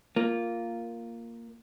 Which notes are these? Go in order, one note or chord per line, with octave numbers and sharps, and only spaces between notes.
A#3 F4